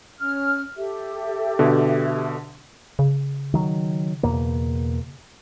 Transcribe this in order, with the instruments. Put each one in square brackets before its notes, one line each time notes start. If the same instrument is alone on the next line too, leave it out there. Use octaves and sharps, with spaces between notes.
[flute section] C#4 F6
G4 A4 E5
[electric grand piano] B2 D3
[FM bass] C#3
[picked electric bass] D#3 F#3
E2 B2 A#3